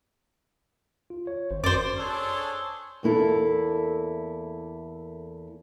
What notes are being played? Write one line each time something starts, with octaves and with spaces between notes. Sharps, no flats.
F4
C#5
G#1 C5
F#2 F#4 C5 D5 D6
D4 G#4 A4 C5 C#5 C6
E2 A#3 E4 A4